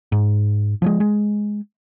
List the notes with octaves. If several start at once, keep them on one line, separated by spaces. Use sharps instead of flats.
G#2
F3 F#3 G#3
G#3